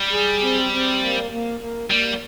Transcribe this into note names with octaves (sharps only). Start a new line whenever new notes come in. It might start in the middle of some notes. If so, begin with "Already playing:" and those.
Already playing: G3
G#4
C4
C4
A#3
A#3
A#3
G3 A#3